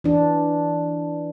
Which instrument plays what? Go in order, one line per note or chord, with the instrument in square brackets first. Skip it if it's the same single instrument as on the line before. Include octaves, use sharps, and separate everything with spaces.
[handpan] E3 D4